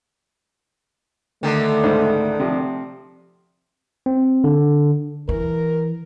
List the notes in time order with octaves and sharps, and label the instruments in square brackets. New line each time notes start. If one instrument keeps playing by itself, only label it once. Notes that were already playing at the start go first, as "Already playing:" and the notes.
[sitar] D3 D#3 [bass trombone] A3
[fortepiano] C#2 G#2 C5
C3 F3
[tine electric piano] C4
D3
[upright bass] E3 [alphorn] A#4